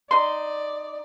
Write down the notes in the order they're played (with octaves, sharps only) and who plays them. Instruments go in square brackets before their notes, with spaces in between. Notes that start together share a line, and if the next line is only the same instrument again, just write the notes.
[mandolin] D#4 C6 [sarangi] D5